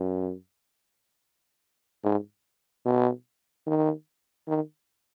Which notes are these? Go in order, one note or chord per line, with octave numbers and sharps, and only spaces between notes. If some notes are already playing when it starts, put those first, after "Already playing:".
Already playing: F#2
G#2
B2
D#3
D#3